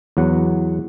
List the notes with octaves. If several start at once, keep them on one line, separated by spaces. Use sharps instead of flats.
E2 F#3 F#5